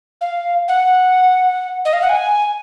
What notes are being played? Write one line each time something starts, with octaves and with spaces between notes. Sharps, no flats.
F5
F#5
D#5
F5
F#5
G#5